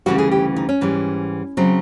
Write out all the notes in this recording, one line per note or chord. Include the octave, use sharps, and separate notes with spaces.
D2 C#3 E3 G3 F#4
G#4
G4
D#4
C#4
G#2 E3 G3
C#3 F#3 C4